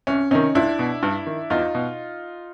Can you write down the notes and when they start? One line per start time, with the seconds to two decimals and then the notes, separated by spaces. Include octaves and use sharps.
0.07 C2 C#4
0.31 C3 D#3 C#4 D#4
0.55 C#2 D4 E4
0.79 B2
1.03 G2
1.26 D#3
1.50 E2 D#4 F4
1.75 B2